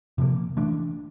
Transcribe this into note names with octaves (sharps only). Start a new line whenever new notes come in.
C3 F3 A#3
E3 A3 D4